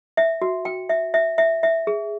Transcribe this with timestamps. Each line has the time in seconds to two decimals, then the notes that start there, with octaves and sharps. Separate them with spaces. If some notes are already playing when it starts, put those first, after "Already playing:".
0.17 E5
0.42 F#4
0.65 G5
0.89 E5
1.14 E5
1.38 E5
1.63 E5
1.87 G#4